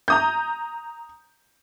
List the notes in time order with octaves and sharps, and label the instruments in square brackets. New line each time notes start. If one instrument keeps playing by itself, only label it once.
[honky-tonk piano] A#5 D#6 G6